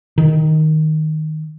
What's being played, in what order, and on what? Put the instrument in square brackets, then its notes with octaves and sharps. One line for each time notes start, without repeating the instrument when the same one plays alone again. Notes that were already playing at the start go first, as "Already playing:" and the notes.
[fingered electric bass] D#3